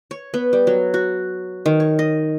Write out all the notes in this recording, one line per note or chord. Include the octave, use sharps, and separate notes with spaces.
C#5
B3
G3
F#3
F#4
D#3
C#5
D#5